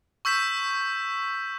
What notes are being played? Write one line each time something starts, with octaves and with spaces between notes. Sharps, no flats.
C#6 E6 G6 B6 E7